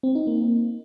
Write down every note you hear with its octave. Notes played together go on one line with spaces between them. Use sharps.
C4
D#4
A#3